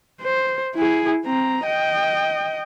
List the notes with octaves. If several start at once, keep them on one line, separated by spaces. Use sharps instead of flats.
C5
E4 G#4
C4 A#5
D#5 G5